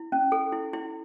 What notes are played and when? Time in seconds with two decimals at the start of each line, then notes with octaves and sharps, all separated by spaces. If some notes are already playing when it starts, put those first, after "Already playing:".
Already playing: E4
0.12 C#4
0.32 A4
0.52 E4
0.73 E4